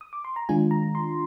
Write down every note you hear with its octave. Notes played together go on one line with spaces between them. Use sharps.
D#6
D6
C6
A#5
D#3 G#3 D4 F4 G#5
A#5
C6